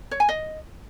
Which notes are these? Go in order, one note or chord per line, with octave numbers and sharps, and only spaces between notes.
C#5
G#5
D#5